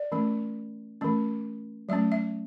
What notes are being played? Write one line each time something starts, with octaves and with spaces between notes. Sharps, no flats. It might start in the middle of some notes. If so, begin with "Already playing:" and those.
Already playing: D5
E3 A3 C#4
E3 A3 C#4
F#3 A3 C#4 E5
E5